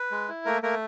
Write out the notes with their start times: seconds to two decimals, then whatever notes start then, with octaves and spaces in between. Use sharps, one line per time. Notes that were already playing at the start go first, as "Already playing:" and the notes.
Already playing: B4
0.11 G#3
0.29 E4
0.45 A3 A#3 A#4
0.63 A3 A#3 A#4